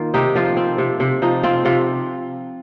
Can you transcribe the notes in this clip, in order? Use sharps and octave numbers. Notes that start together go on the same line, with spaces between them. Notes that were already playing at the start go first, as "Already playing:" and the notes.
Already playing: D#3 A#3 F4
C3 D#4 G4
F3 F4
C4
C3
C3
F3 D#4
C4 F4
C3 F4